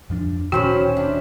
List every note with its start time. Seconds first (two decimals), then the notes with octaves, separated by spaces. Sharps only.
0.10 F2 F3 D4
0.52 D1 A#2 D#3 C#4 F#4 C5 G5 B5
0.97 D4 D5 E5